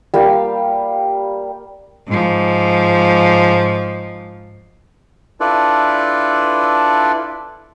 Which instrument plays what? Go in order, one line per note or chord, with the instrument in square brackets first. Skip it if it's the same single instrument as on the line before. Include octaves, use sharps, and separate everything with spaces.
[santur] G3 A#3 F5
[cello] G#2 F3
[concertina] D4 E4 F4 A4 B4 D5